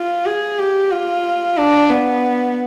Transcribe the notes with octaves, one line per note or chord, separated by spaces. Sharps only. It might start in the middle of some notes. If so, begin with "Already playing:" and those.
Already playing: F4
G#4
G4
F4
D4
B3